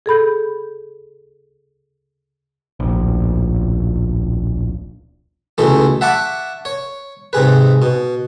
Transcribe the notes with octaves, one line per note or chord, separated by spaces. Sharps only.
G#4 A4 B5 G6
D1 A#1
C#2 B2 E3 A3
E5 F#5 A5 B5 C#6 D6
C#5
G#2 C3 G#4 B4
B2